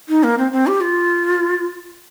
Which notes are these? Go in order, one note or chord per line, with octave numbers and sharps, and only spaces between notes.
D#4
A#3
C4
C4
G4
F4